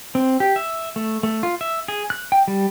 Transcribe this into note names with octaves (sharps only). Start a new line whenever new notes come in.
C4
G4
E5
A3
A3
F4
E5
G#4
F#6
G5
G3